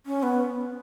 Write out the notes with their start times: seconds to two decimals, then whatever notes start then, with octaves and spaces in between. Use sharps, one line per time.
0.06 C#4
0.23 B3